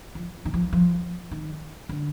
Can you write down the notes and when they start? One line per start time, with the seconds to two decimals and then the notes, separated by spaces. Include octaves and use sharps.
0.15 F3
0.45 D#3
0.54 F3
0.73 F3
1.31 D#3
1.89 D3